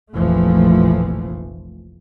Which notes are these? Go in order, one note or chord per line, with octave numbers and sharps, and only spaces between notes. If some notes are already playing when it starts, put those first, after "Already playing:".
F1 A#1 E3 F3 A3